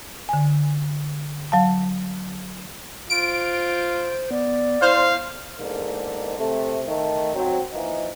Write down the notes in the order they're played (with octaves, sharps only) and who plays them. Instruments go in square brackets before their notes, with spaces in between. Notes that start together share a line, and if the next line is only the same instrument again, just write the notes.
[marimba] D3 G#5
F#3 F5 A5
[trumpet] F4 [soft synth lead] C5 [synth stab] D7
[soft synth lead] B3 [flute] D5
[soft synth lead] E4 [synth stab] C5 [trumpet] F5
[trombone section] E2 G#2 D3 D#3 A#3
C3 A3
D#3 A3
F#3 C4
E3 F3 A#3 D#4